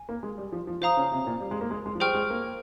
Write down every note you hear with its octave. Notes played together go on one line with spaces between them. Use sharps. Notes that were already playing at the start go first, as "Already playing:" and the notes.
Already playing: G#5
A#3
G#3
G3
F3
F3
F3 C5 F5 A#5 D#6
C#3
C3
A#2
G3
G#3
A#3
G#3
G#3
F3
G3 G#4 C5 G5 C#6 F6
G#3
A#3